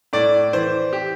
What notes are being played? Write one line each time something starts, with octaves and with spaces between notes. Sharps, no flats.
A2 D5
E3 C5
G4